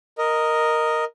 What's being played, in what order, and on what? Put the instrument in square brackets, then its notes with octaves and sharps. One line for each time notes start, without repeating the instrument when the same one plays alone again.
[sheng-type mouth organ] A#4 D#5